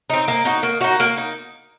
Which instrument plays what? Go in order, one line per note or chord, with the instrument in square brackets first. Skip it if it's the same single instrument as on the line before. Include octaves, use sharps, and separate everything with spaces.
[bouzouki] C4 D#4
A#3
D#4 F#4
A#3
D#4 F#4
A#3
D#4